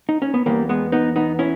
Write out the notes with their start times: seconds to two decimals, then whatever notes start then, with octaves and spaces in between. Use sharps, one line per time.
0.09 D#4
0.22 C#4
0.34 B3
0.46 E2 C#3 E3 G3 A#3
0.69 G#3 B3
0.92 B3 D#4
1.16 B3 D#4
1.39 C#4 E4